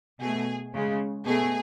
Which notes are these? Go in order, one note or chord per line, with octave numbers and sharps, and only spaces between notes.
B2 A3 G#4
C#3 G#3
B2 A3 G#4